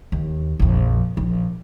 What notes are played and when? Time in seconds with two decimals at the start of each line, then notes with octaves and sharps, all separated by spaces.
0.12 D#2
0.60 A#1 F2
1.17 A#1